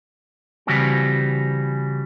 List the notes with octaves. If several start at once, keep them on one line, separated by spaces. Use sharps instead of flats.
C#3 E3 G3 C4 F#4 G4